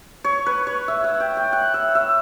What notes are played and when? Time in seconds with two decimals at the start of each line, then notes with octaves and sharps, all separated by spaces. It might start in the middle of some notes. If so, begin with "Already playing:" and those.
0.24 C#5
0.46 B4
0.67 C#5
0.88 E5
1.04 F#5
1.20 G5
1.37 G5
1.53 F#5
1.74 E5
1.95 E5